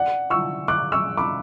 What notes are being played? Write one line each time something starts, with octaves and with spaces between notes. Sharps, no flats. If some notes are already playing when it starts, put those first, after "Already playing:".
Already playing: D5 F#5
C#6 E6
D6 F#6
C#6 E6
B5 D6